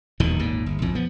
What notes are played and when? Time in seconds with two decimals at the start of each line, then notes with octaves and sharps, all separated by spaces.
0.20 D#1 E2 B2 D#3
0.39 G#1 D#2 A#2
0.66 G1
0.82 A#1 F2 A2
0.95 F3 B3